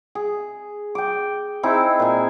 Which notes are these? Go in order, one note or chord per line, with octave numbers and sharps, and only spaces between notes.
G#4
G5 D6
C4 D#4 E4 G#4
A#2 G#5